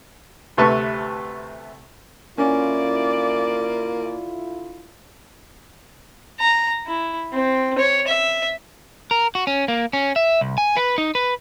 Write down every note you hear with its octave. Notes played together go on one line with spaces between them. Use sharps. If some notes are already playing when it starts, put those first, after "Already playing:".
D2 C3 A3 B4 A5 C#6
D3 A#3 C#4 E4 F4 D5
A#5
E4
C4
C#5
E5
A#4
F#4
C#4
A#3
C#4
E5
C2
G#5
B4
D#4
B4